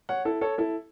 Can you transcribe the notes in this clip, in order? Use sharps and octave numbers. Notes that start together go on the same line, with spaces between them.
C#5 F#5
E4 A4
A4 C#5
E4 A4